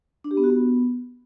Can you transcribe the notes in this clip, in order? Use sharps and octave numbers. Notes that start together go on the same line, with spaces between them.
D4
G4
B3
F#4
B3